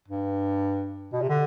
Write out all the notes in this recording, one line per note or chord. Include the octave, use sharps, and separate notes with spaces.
G2
B2
C3
D3